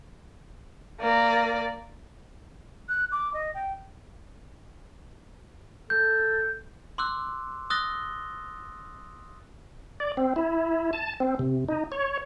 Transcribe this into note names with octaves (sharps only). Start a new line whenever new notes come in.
A#3 D5
F#6
D6
D#5
G5
A4 G6
C6 D6 E6 F#6
D#6 E6 F#6 A6 A#6 G7
D5
C4
E4
A5
C4
C3
D#4
C#5